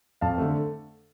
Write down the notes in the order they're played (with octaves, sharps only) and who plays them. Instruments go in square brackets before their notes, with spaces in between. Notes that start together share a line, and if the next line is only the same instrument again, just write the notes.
[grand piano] F2 F5 A5
D3 A3